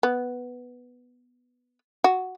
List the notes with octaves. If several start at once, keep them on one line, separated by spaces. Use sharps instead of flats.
B3
F#4